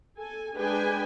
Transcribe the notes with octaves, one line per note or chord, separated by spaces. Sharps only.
A4 G#5
G#3 D4 G#4 B4 G5 G#5